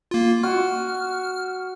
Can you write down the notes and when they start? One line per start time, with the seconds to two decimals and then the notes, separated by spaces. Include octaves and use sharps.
0.11 A#3 F4
0.43 F#4 F6